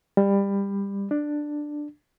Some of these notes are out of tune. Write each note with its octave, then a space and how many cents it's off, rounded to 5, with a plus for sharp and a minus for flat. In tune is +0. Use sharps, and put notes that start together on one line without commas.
G3 +20
D4 +10